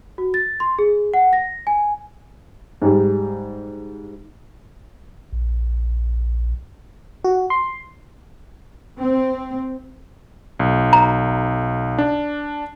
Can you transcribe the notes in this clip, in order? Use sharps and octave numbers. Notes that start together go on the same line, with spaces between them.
F#4
A6
C6
G#4
F#5
A#6
G#5
G#2 G3
A#1
F#4
C6
C4
B1
A#5
D4